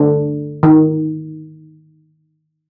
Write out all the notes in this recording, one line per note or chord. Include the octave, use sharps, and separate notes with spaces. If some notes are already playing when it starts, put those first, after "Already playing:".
Already playing: D3
D#3